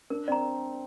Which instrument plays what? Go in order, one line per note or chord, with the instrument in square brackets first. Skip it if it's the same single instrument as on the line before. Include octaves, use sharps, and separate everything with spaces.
[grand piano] D4 [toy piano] A#4
[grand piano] C4 [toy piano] D5 A#5